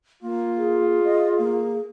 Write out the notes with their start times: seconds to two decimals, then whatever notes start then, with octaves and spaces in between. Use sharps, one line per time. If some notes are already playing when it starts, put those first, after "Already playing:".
0.23 A#3 F4
0.58 G#4
1.04 D#5
1.39 A#3